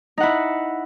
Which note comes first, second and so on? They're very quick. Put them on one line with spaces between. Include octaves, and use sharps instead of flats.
D#4 F#5 E4